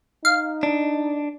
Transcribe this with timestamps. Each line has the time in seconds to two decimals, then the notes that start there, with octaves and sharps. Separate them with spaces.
0.25 D#4 F5
0.63 D4